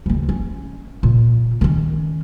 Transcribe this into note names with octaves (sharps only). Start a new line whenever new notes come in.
F#1 D#2
C#4
A#2
D#3 C#4